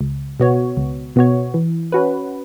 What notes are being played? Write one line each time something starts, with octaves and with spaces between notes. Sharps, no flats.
C#2
B2 B3 F#4 C#5
C#2
B2 B3 F#4 C#5
E3
C#4 F#4 B4